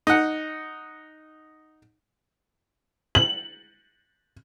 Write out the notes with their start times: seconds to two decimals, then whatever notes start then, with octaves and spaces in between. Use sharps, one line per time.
0.07 D#4 F#5
3.15 F#7